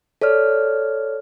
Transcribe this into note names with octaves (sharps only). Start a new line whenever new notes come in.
A4 C#5 D5 F6